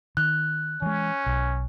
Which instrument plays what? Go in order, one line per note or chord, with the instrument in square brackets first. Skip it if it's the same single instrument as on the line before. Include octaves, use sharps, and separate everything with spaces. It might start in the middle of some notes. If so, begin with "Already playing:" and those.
[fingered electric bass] D#3 [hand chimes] F#6
[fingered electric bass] E3 G#3 [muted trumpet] C#4
[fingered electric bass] B1